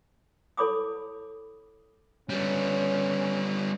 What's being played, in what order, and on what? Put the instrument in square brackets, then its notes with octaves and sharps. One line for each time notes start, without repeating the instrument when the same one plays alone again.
[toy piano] E4 A4 C#5 B5 D6 D#6
[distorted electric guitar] G3 B3 [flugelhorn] C#4